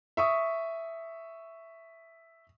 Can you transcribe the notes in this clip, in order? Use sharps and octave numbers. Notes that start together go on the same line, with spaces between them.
E5 C#6 D#6